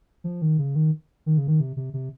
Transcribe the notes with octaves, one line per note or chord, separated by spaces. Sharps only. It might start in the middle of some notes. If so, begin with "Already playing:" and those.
F3
D#3
C#3
D#3
D#3
C#3
D#3
C3
C3
C3